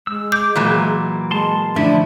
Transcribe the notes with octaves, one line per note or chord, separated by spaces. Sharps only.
G#3 E6
D6 G6
A#2 E3 F#3
G#3 A5 C6
D3 F3 A3 D4 E4